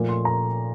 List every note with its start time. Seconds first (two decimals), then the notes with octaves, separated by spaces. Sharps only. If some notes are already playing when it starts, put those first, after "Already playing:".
Already playing: A#2 F3 A3
0.09 C6
0.25 A#5